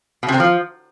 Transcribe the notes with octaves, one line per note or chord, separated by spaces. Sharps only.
B2
C3
C4
F3